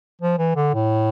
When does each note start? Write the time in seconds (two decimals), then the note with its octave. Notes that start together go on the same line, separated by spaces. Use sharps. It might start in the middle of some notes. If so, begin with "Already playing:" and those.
0.21 F3
0.38 E3
0.56 D3
0.74 A2